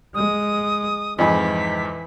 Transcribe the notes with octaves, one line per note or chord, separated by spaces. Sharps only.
G#3 D#6
F2 G#2 E3 D#5 G#5 B5 B6